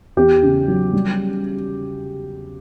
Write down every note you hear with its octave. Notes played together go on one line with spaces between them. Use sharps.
E2 G4
C#3
F#3
G3